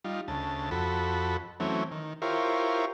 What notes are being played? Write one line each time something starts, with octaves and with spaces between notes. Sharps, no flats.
G3 D#4 F4
D2 C#3 A5
F2 F#4 A4 B5
E3 F#3 A3 C4 C#4
D#3
E4 F4 G4 A#4 C5 C#5